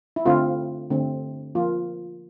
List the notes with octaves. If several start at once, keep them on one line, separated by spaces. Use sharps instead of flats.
E4
D3 A3 C4 F4
D3 A3 C4
F3 A#3 F4